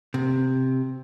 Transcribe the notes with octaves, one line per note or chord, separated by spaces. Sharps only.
C3